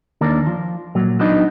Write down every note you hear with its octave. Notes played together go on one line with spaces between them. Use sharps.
D#2 D4 A#4
F3
A#2 F#3
F#3 B3 D4 D#4